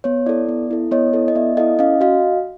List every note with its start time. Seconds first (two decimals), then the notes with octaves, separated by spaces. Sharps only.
0.04 B3 C#5
0.26 E4 A4 D5
0.49 B3
0.71 E4 A4
0.91 B3 C#5 D#5
1.13 E4 A4
1.28 D#5
1.35 B3 D5 E5
1.57 E4 A4 D#5 F5
1.79 C#4 D#5 F5
2.01 F#4 D#5 F5